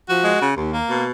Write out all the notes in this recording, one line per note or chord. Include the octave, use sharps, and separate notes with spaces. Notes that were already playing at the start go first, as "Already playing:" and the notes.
F3 F#4
G#3
C#3
D#2
A#3
B2